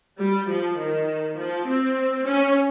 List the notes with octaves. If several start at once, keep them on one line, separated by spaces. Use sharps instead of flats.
G3
F3
D#3
F3
C4
C#4